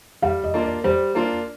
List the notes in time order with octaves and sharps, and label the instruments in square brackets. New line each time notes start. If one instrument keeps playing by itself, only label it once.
[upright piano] G3 [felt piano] F5
[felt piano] D#5
[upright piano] A#3 D4 F4
[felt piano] D5
[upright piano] G3 [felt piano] C5
[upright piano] A#3 D4 F4